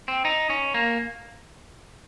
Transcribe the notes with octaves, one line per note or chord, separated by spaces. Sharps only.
C4
D#4
C#4
A#3